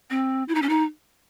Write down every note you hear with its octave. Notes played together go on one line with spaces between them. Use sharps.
C4
E4
D#4
C#4
D#4